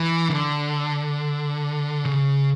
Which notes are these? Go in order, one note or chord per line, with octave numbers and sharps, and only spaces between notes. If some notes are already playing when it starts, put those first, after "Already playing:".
Already playing: E3
D3
C#3